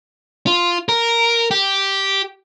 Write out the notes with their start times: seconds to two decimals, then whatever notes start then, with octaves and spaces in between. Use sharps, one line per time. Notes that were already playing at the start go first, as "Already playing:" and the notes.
0.47 F4
0.89 A#4
1.51 G4